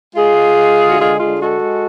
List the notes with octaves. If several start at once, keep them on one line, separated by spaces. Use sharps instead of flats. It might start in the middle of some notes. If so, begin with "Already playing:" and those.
G#3 F4 G#4
G#3
G#3
D3
F#4
G#3 F4 G#4
D3 F4 G#4
G#3 F#4 A4
G#3